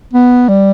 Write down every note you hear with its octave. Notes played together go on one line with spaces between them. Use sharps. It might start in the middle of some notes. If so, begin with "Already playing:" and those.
B3
G3